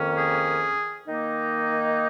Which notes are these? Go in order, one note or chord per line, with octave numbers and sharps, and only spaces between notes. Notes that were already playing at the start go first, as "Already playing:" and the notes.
Already playing: F2 D#3 A#3 C#4
G#4
D#3 A#3 D#4